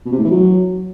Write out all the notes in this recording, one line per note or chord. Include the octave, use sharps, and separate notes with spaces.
B2
C3
A2
E3
F#3